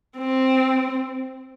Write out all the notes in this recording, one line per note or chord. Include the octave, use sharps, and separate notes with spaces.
C4